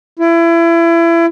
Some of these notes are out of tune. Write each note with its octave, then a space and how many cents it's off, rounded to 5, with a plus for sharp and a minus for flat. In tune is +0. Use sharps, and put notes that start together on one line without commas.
E4 +30